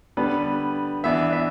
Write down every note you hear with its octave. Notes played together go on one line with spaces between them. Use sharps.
D3 G3 B3 B4
E3 B3 D4 E5
E5